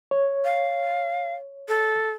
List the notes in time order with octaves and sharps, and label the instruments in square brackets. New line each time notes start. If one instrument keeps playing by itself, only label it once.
[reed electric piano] C#5
[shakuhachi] F5
A4